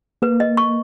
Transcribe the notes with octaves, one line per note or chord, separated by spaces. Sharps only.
A#3 B4
D#5
C#6